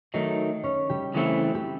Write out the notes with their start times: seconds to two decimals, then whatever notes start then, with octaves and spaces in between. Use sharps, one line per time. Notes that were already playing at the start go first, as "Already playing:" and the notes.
0.14 D#3 F#3 A3 D#4 D#5
0.64 C#4 C#5
0.89 G3 G4
1.14 C#3 E3 A3 C4
1.55 G4